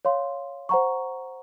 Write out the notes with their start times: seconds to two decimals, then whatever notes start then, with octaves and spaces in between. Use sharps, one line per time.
0.05 C#5 F5 C6
0.69 C5 F#5 A#5 C#6